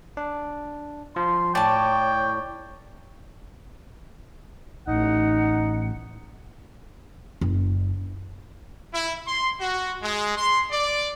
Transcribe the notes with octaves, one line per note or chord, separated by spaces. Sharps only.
D4
F3 C6
A2 C#5 D5 G5 A5
A1 D#4 F#5
F#1
E4
C6
F#4
G#3
C6
D5